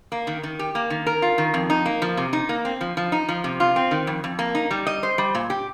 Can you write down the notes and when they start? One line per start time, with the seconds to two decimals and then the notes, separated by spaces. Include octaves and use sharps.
0.12 A#3
0.27 D#3
0.43 D#3
0.59 G4
0.75 A#3
0.90 D#3
1.06 A#4
1.22 F4
1.38 D#3
1.54 F2
1.70 D#4
1.86 A#3
2.02 F3
2.17 C3
2.33 D#4
2.49 A#3
2.65 C4
2.81 F3
2.97 F3
3.12 D#4
3.29 F3
3.44 C3
3.60 F4
3.76 C4
3.91 D#3
4.07 F2
4.24 F2
4.39 A#3
4.55 D#4
4.71 G3
4.87 D#5
5.03 C5
5.18 G3
5.35 A#2
5.50 G4